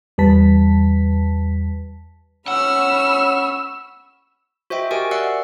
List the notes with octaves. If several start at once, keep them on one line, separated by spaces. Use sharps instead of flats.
E2 G3 B4 A5 B6
C#4 F#5 B5 C#6 E6 F6
F#4 C5 D#5 E5 G5
G4 A#4 D#5 G#5 C#6 D7
D5 E5 F#5 E6 F#6 C7